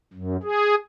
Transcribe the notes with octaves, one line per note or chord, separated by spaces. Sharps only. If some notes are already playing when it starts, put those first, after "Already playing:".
F#2
G#4